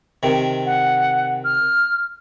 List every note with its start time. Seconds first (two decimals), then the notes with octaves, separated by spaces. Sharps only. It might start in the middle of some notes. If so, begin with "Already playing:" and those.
0.23 C3 D#3
0.66 F#5
1.45 F6